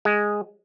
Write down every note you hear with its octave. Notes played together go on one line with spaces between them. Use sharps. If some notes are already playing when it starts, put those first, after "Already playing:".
G#3